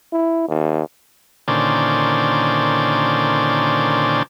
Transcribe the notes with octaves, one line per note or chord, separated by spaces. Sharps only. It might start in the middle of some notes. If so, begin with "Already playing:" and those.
E4
D#2
A#2 D3 D#3 C#4 C5 D5